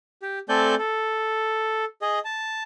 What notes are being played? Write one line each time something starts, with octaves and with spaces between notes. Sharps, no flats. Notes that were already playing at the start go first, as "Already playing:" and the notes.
G4
A3 C4 A4 D5 G#5 G6
A4
G#4 D#5
A5